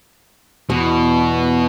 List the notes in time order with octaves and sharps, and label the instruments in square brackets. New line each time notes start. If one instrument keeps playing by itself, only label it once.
[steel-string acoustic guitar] E2 [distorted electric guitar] B2